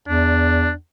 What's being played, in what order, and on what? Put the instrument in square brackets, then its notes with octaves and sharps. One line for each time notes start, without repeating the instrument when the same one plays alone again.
[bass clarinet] E2 [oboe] D4